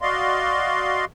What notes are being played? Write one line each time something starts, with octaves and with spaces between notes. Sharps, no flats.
F#4 D5 D#5 F5 C6